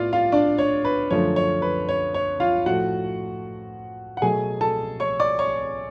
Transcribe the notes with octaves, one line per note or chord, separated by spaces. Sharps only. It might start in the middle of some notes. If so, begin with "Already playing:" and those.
Already playing: A2 B3 F4 D5 F5
F4 F5
D4 D5
C#5
B4
F#2 D3 F3 A3 C#5
C#5
B4
C#5
C#5
F4 F5
A2 F3 A3 F#4 F#5
F#5
B2 F#3 A3 G#4 G#5
A4 A5
C#5 C#6
D5 D6
C#5 C#6